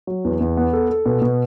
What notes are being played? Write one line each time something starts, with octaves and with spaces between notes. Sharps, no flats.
F#3
E2
E2
B3
A4
A4
B2
B2